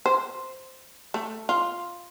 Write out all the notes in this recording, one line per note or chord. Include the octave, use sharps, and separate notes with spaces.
C5
A3
F4